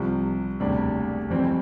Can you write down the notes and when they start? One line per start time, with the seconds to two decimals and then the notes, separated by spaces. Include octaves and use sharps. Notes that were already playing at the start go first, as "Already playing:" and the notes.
Already playing: C2 C3 F3
0.60 E1 D2 C3 G3 D4
1.30 F2 E3 G3 C4